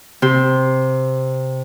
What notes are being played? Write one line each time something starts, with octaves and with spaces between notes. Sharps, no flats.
C3 C5